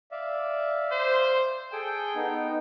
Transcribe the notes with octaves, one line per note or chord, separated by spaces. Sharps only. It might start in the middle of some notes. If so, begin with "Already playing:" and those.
D5 E5 F5
C5
G#4 A4 G5 G#5
B3 D#4